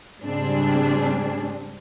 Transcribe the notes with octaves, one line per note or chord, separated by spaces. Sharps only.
G#2 C#3 G3 C4 D4 G#4